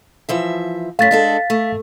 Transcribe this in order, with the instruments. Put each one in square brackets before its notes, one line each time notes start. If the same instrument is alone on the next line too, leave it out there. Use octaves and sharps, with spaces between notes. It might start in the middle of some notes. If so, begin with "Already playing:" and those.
[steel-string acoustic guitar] E3 F3 E5
[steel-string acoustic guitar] F#2 A3 [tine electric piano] F5 A6 B6
[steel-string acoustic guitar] G#3 D4 A4
A3